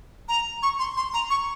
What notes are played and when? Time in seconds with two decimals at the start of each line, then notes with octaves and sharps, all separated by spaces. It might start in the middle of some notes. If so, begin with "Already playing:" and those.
0.28 A#5
0.63 C#6
0.79 C6
0.97 C6
1.14 A#5
1.30 C#6